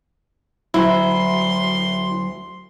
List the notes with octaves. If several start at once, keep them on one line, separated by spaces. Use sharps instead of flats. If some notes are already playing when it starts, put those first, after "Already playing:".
D2 F#3 E4 C6